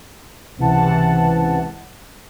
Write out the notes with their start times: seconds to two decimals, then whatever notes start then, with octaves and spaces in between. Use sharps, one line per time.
0.57 C#2 C3 E3 F#5 A5